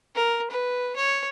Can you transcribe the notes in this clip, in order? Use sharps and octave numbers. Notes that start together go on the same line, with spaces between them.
A#4
B4
C#5